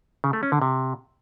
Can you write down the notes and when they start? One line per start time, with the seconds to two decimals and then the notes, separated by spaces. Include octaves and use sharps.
0.24 C#3
0.33 A3
0.43 C#4
0.52 D3
0.62 C3